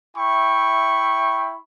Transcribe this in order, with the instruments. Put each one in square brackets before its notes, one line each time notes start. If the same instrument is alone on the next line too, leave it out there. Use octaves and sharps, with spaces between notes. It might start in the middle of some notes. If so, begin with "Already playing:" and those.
[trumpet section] E4 E5 G5 B5 C#6